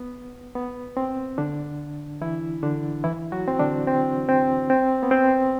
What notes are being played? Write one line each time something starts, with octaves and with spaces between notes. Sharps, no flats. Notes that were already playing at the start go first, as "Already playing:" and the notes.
Already playing: B3
B3
C4
D3 D4
E3 E4
D3 D4
E3 E4
F#3 F#4
C4
D3 D4
C4
C4
C4
B3
C4